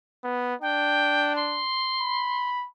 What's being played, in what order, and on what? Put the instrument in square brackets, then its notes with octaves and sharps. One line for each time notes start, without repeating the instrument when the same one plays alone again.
[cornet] B3
[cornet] D4 [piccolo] G5
[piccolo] C6
[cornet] B5